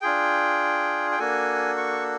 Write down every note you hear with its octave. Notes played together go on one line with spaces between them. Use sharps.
D4 F4 G#4 G5
G5
A#3 D4 F#4 A4 G#5
C#6